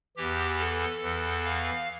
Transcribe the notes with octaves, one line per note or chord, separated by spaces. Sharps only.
E2 E3 G4
A4
E2 E3
F5